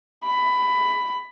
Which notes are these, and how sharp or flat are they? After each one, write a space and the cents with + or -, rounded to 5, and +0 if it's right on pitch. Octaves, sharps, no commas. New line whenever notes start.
B5 +15